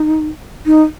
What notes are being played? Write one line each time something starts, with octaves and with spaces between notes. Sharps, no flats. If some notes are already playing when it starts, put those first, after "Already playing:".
Already playing: D#4
D#4